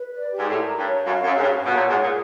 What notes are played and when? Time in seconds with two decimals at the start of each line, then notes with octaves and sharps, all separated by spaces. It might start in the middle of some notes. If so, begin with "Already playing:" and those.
Already playing: B4
0.12 D5
0.31 G4
0.39 G#2
0.49 A2 A#4
0.68 A#5
0.78 G2
0.86 C#5
1.05 F#2 F5
1.24 F#2 C#5
1.37 G#2
1.42 G2 F5
1.61 B2 C#5
1.75 A#2
1.80 F#5
1.89 G#2
1.98 A#2 G#4